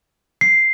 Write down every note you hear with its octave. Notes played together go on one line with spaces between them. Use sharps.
C7